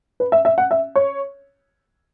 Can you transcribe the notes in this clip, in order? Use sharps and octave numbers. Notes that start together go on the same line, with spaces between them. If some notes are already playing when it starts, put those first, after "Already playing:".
B4
E5
E5
F#5
E5
C#5